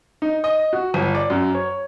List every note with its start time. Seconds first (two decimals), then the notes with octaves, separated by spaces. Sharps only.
0.22 D#4
0.44 D#5
0.73 F#4
0.94 G1
1.15 D5
1.30 F#2
1.55 C#5